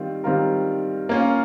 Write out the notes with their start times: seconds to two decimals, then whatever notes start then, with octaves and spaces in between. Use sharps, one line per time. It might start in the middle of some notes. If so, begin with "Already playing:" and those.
Already playing: D#3 G3 C4 F4
0.24 D#3 G3 C4 F4 A#4
1.09 A#3 C#4 F4